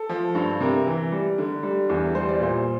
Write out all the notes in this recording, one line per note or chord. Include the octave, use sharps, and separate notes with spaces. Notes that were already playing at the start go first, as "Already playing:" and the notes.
Already playing: A4
F3
G2
C3 A#4
E3
G3
D3
G3
E2
G3 C5
D5
A#2 C5